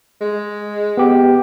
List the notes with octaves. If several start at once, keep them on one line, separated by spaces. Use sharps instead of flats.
G#3
B3 G4